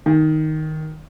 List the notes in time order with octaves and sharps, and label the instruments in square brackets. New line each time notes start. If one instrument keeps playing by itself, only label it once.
[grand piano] D#3